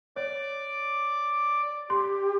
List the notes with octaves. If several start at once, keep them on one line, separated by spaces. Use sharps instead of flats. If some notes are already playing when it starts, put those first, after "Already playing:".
C#5 D5 D6
G4 C6